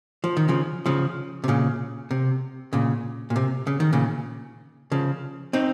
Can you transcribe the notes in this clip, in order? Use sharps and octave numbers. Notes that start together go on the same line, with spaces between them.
F3
D#3
C#3 F3
C#3 F3
C3
A#2 C#3
C3
A#2 C#3
A#2
C3
C#3
D#3
A#2 C#3
C#3 F3
C4 D#4